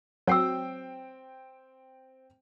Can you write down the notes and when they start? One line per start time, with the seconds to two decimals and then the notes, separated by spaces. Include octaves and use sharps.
0.27 F#3 C4 C#5 G5 E6 C7